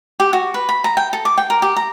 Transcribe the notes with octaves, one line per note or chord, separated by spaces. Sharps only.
G4
F#4
B4
B5
A#5
G5
A4
D6
G5
A#4
G4
A#5